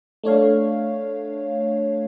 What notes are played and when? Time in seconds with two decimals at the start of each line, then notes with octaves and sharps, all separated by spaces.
0.23 A3 D4 C#5 F5